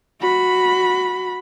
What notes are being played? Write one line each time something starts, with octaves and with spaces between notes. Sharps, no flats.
F#4 B5